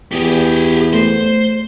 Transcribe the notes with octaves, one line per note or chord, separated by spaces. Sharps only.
E2 G4 G#4
A3 C5